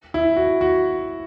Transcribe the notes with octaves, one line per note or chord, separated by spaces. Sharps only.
E4
F#4
F#4